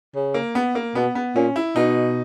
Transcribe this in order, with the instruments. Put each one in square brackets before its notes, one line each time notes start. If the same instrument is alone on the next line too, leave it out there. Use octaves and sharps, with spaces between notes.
[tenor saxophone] C#3
[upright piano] A#3
B3
A#3
[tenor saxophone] B2 [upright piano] B3
[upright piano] B3
[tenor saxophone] A#2 [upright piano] C#4
[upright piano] E4
[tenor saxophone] B2 [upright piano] D#4